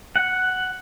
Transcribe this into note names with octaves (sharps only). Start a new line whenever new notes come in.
F#5